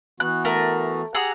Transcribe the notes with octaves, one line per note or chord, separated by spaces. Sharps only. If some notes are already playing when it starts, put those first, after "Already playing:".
E3 B3 F#4 F#6
A3 A#4
G4 G#4 F#5 A#5 E6